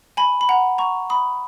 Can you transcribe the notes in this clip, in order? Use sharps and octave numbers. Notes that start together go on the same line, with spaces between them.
G#5 B5
B5
F#5 A#5
A#5 C#6
B5 D#6